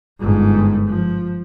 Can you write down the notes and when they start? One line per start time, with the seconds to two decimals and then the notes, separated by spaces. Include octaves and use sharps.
0.20 G1 G#2
0.86 F3